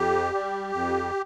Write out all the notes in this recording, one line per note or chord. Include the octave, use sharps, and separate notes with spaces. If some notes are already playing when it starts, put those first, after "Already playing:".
Already playing: F2 G4
G3
F2